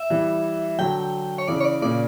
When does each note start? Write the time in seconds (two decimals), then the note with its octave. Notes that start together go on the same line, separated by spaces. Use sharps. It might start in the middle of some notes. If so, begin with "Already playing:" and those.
Already playing: E5
0.10 E3 G3
0.78 D3 F#3 G5
1.38 C#5
1.48 C#3 E3 D5
1.60 C#5
1.65 D5
1.82 A#2 C#3 D5